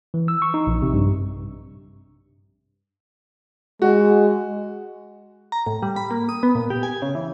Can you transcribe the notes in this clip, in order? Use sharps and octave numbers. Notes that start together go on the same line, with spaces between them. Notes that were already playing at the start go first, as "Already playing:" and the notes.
E3
E6
C#6
D#4
A#1
C3
G2
G#3 F#4
A#5
A2
G3
B5
A#3
D#6
B3
A#2
G4
G#5
C#3
E3